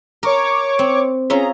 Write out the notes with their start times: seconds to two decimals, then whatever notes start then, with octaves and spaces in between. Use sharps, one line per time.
0.23 A#4 C#5 C#6 D6
0.79 C4
1.30 C#4 F4 G#4 E5 A#5